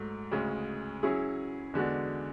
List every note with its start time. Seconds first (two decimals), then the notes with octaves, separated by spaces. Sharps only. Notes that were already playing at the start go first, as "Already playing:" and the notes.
Already playing: G#2 F#3 A3
0.31 D2 C#3 G#3 C#4
1.03 F#3 C#4 E4 G#4
1.74 E2 D3 G#3 D4 F#4